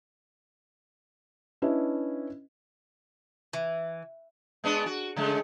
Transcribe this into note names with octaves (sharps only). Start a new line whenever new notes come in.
C#4 D4 E4 B4 D#5 E5
E3
G#3 B3 D4
F#4
C#3 G#3 A3